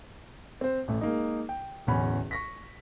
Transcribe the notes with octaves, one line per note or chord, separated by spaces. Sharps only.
C4 C5
A1 A3
G#3 A#3 D#4
G5
D1 A1 E2 C#4 B5
C#6 A#6 B6